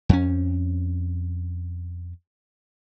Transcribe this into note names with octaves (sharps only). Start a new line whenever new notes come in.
F2 C#4